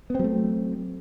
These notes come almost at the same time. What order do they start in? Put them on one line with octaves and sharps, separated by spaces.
B3 C4 F#3 A3